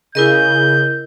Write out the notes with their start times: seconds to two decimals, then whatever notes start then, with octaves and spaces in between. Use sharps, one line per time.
0.15 C#3 E4 A#4 D#5 G6